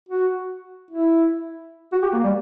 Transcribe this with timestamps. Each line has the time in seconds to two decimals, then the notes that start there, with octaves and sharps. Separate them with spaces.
0.09 F#4
0.91 E4
1.92 F#4
2.02 G4
2.13 A#3
2.24 G3